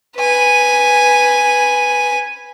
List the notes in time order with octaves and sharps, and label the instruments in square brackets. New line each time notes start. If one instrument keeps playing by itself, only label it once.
[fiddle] B4 G#5